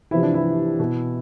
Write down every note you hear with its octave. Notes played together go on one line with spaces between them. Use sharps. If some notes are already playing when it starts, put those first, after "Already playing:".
C3 E3 F3 E4
D4
E3 E4
B2